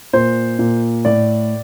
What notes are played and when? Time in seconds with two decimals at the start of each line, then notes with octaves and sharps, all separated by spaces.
0.13 A#2 C5
0.59 A#2
1.05 A2 D5